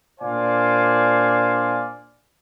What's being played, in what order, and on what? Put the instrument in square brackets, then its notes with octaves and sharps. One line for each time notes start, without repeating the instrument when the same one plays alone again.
[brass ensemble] A#2 D4 C5 D5 F5 G#5